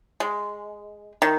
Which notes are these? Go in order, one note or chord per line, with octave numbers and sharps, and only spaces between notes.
G#3
D#3